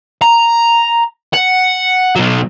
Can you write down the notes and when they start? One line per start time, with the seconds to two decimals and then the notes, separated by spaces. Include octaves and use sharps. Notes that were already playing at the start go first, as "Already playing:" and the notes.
0.22 A#5
1.33 F#5
2.16 B2 F#3